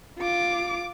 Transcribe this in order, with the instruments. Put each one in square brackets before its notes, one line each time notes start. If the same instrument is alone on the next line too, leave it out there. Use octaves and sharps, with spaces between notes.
[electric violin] F4 D6